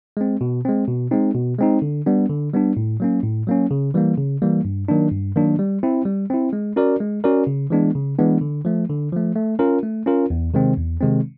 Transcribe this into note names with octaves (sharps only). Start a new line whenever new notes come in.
G#3 C4
B2
G#3 C4
B2
G#3 C4 D#4
B2
G#3 C4 D#4
D3
G3 B3 D4
D3
G3 B3 D4
A2
F#3 A#3 C#4
A2
F#3 A#3 C#4
C#3
E3 G3 A#3
C#3
E3 G3 A#3
G2
D#3 F#3 A#3 D4
G2
D#3 F#3 A#3 D4
G3
C4 E4
G3
C4 E4
G#3
C#4 F#4 A#4 D5
G#3
C#4 F#4 A#4 D5
C#3
E3 G#3 B3 D4
C#3
E3 G#3 B3 D4
D3
F3 A3
D3
F3 A3
A3
C#4 F4 A#4
A3
C#4 F4 A#4
E2
C3 D#3 G#3 C4
E2
C3 D#3 G#3 C4